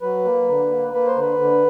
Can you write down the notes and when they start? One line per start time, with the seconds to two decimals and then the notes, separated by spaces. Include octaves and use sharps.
0.01 F#3 B4
0.25 A#3
0.48 D3
0.70 A#3
0.93 A#3 B4
1.07 C5
1.15 D3
1.21 B4
1.39 D3